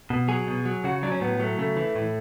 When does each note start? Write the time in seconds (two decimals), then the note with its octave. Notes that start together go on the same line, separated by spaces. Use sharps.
0.10 B2
0.28 F#3 G#4
0.47 B2
0.65 F#3
0.84 C#3 F#4
1.03 F#3 D4
1.12 C#4
1.21 A2 B3
1.40 F#3 A3
1.58 C#3 A3
1.77 E3
1.95 A2